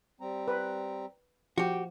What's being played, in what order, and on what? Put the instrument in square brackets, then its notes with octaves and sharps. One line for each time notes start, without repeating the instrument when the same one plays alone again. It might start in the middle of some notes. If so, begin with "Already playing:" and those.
[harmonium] G3 C4 A#5
[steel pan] B4
[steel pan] F3 [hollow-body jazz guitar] F#4 G4 [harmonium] G5